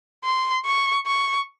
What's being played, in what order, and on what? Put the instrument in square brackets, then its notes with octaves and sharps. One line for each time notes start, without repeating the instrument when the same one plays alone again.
[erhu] C6
C#6
C#6